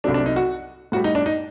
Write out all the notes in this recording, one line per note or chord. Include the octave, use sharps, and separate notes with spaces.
C2 C3 F#3 A3 D4
D4
D#4
F#4
A2 G3 F#4
D#4
D4
D#4